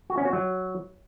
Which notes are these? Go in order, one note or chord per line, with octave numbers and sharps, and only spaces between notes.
F#4
C#4
F#4
F#3